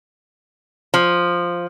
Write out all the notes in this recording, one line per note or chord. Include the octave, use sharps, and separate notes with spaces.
F3